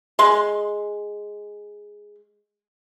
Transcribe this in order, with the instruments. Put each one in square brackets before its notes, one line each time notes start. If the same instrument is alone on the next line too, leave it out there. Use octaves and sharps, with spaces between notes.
[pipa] G#3 C6